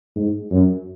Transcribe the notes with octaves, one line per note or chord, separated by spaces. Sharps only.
G#2
F#2